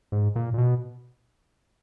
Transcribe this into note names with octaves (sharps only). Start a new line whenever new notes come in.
G#2
A#2
A#2
B2